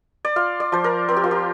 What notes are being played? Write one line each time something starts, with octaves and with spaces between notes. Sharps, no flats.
D5
F4 F5
D5
F3 C5
A#4
C4 A#4
G4
F4
G4